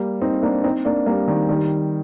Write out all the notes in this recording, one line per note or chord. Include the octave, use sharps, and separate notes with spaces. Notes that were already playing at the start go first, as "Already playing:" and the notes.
Already playing: G3 A#3
C4 D#4
A#3 D4
C4 D#4
A#3 D4
G3 A#3
D#3 G3
D#3 G3